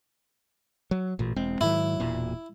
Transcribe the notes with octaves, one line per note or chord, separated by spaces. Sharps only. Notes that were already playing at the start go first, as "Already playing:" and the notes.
F#3
A1 A#2
E1 G#3 C4
G#2 D#3 F#3 E4
E1 A#2